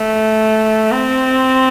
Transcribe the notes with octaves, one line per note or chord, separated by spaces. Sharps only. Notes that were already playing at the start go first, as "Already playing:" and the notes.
Already playing: A3
C4